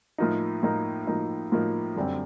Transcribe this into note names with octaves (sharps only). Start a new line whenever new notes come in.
A2 F3 A#3 D#4
A2 F3 A#3 D#4
A2 F3 A#3 D#4
A2 F3 A#3 D#4
F#2 D3 G3 C4